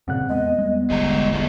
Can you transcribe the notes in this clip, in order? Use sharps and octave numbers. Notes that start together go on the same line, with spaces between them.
G2 A#2 C#3 C4 F#5 F#6
E2 G#3 B3 D#5
G3 G#3 B3
E1 A1 D3 G#3 G4 D#5 A#5
G3 G#3 B3